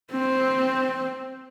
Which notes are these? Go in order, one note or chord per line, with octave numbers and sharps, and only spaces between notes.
C4